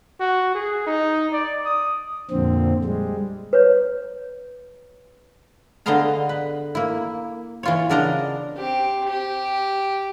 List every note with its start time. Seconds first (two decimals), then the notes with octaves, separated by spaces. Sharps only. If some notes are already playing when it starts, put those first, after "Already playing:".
0.20 F#4
0.55 G#4
0.87 D#4
1.33 D5
1.65 D#6
2.31 F2 A#2 D3 C4
2.85 G3 G#3
3.53 B4 C#5
5.86 D3 B3 G#4 D#5 F5 A#5
6.29 B4
6.75 A#3 E4
7.63 E3 F4 C#5
7.90 C#3 B3 D4 A#4 D#5 A#5
8.57 C4 G4
9.09 G4